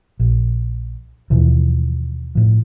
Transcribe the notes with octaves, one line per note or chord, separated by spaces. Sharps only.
A#1
D#2 B2 E3 F3
A2 F3